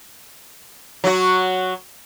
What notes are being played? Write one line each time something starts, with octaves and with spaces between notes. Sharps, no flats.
F#3 F#4